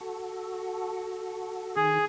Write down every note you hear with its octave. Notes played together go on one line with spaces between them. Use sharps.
F#4 A4
D#3 G#4